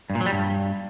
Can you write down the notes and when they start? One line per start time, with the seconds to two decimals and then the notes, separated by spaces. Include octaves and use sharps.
0.10 G2
0.15 A#2
0.21 F#3
0.26 G3
0.32 G2